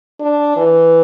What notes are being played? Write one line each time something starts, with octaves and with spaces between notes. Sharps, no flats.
D4
E3